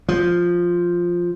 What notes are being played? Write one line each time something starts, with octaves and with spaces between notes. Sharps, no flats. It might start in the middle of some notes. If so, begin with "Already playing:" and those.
F3